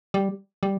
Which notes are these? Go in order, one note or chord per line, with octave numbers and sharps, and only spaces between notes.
G3
G3